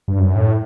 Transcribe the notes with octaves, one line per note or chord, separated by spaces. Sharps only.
G2
F#2
A2